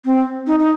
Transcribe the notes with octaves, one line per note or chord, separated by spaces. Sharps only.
C4
D#4
D#4